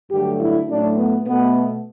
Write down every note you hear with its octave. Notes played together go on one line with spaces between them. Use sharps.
G2 D3 F#3 A3 G4
E4
A2 F#3 A3 D4
B3
B2 A3 B3